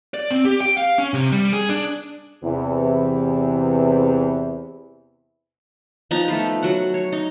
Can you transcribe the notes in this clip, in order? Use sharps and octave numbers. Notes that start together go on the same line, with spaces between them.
D5
C4
G4
G5
F5
C#4
C3
G3
G#4
D4
E2 C3 E3
F3 B3 D#4 A#5
A3 F4 B4
F#3 F#5
C#5
D#4